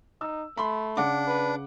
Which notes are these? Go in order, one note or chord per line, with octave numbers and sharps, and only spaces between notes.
D#4 E6
A3 B5 C6
C#3 D4 F#5 D6
B4